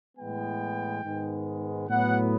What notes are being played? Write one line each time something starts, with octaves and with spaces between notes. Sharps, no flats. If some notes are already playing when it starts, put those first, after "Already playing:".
A2 E3 G#3 B3 G5
G#2 D#3 G#3 B3
A2 F#3 B3 F#5